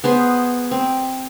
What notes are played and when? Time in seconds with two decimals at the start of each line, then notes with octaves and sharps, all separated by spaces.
0.04 B3 G#4 C5
0.71 C4